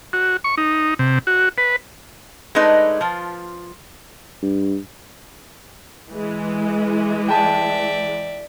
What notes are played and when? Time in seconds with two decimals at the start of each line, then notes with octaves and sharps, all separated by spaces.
0.13 F#4
0.44 C#6
0.57 D#4
0.99 C3
1.27 F#4
1.58 B4
2.55 G#3 A3 D4 D#4 B4
3.01 F3 F4
4.42 G2
6.10 E3 G#3
7.29 D5 E5 G5 A5